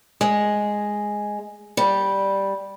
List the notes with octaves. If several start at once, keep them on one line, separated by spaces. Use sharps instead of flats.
G#3
G3